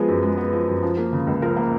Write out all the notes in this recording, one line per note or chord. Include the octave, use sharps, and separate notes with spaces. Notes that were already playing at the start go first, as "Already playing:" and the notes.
Already playing: F3 G#3 B3 G#4
F#2
G#3
B3
F3
F#2
F3
A#3
C#3
C#2
F3 A#4
A#3